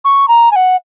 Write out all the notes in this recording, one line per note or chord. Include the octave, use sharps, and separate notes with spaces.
C#6
A#5
G#5
F#5